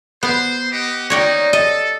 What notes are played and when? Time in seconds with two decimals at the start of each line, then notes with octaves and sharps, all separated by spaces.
0.23 B3 C5
0.72 G4 D#5 F#5
1.10 A#3 D#4 C#5 D5 G5
1.53 A4 D#5